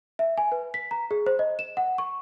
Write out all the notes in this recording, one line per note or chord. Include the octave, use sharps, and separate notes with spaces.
E5
G#5
B4
B6
A#5
G#4
C5
D#5
E7
F#5
C#6